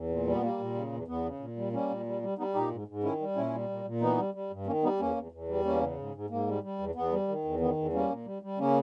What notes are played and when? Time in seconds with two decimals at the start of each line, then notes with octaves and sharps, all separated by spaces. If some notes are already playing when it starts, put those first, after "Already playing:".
Already playing: E2
0.09 A#2
0.27 G3
0.34 B3
0.42 G3 A#3
0.59 A#2
0.75 C#3
0.92 E2
1.08 E2 B3
1.25 C#3
1.40 A#2
1.57 G3
1.73 G3 A#3 C#4
1.89 A#2
2.06 G3
2.22 G3
2.38 G3 B3 D#4
2.54 A#2 D#4 G4
2.71 G#2
2.88 G#2
3.03 D#3 C#4 E4
3.20 G3
3.36 A#2 C#4 E4
3.53 G3
3.69 A#2
3.85 A#2
4.01 E3 B3 D#4
4.18 G3
4.34 G3
4.50 G2
4.67 D#3 A#3 C#4
4.83 G3 B3 D#4
5.00 E2 A#3 C#4
5.16 E2
5.32 E2
5.48 G3
5.65 E2 A#3 C#4
5.81 C#3
5.97 G#2
6.14 G#2
6.30 G#2 A#3
6.47 G3
6.63 G3
6.79 E2
6.95 E2 B3
7.12 G3
7.28 D#3
7.44 E2
7.60 D#3 B3
7.76 E2
7.93 G3 A#3 C#4
8.09 A#2
8.26 G3
8.42 G3
8.58 C#3 A#3 C#4